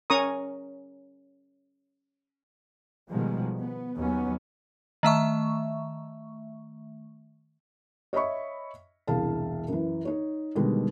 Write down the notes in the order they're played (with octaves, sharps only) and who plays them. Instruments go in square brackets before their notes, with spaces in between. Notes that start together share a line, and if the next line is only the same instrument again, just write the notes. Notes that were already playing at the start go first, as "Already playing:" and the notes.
[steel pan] C#4 A#4 A#5 C#6 D#6
[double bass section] B2 D#3 F3 G3 G#3
B3
D#2 F#3 B3 C#4
[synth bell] D#3 A3 E5 C#6
[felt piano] C#5 D#5 E5 B5 C#6
E1 C2 E4 G#4 F5 A5
F#2 E3
D#4 C#5
B2 D3 D#3 G3 G#3